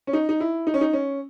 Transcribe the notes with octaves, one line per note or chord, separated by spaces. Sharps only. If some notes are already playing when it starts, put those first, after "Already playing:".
C#4
D#4
D#4
E4
D#4
C#4
D#4
C#4